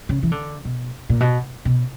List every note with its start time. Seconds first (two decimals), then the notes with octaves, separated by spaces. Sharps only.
0.09 C#3
0.23 E3
0.32 D3
0.65 B2
1.09 A#2
1.20 B2
1.65 B2